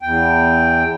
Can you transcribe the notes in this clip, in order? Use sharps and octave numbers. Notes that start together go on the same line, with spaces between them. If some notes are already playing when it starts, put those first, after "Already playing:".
E2 G5